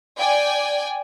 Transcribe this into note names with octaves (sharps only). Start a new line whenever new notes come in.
D5 G5 G#5